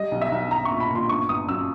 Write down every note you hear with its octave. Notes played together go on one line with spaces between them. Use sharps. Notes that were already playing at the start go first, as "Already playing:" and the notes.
Already playing: G3 D#5
B1
E5
B1
B1 A#5
A#2 C#6
B5
A#2 C6
G1 C#6
G1 D#6
F#2 E6